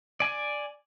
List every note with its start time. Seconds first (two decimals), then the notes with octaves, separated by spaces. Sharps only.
0.20 D5 G#5